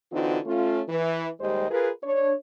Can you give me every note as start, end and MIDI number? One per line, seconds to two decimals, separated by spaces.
0.12 0.38 50
0.12 0.38 52
0.12 0.38 60
0.12 0.38 63
0.12 0.38 65
0.12 0.38 66
0.45 0.81 57
0.45 0.81 61
0.45 0.81 65
0.89 1.28 52
1.41 1.68 39
1.41 1.68 55
1.41 1.68 56
1.41 1.68 67
1.41 1.68 72
1.41 1.68 75
1.70 1.90 65
1.70 1.90 68
1.70 1.90 70
1.70 1.90 71
2.03 2.33 62
2.03 2.33 73